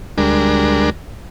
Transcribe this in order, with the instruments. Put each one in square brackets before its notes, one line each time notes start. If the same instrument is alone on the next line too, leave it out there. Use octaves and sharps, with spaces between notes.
[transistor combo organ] D2 G3 G#3 D4 A#4